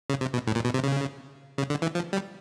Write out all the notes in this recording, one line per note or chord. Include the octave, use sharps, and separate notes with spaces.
C#3
C3
B2
A2
A#2
B2
C3
C#3
C#3
D3
E3
F3
G3